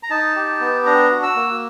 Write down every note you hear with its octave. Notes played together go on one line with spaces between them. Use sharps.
A#5
D#4 A5
G4
B3
D4 A#5
F#4
E6
A#3